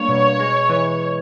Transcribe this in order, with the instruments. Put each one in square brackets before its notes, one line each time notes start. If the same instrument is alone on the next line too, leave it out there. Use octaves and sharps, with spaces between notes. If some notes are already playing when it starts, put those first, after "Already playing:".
Already playing: [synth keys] G3 A#3 D4 [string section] C#5
[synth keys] B2
G#3
E3